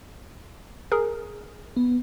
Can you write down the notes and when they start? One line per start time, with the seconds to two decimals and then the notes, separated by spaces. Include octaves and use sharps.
0.92 G#4 A#4
1.77 B3